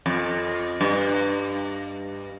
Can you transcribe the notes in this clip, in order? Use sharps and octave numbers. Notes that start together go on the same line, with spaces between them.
F2
G2